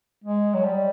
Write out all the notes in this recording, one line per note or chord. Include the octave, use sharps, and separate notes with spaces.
G#3
F#3
G3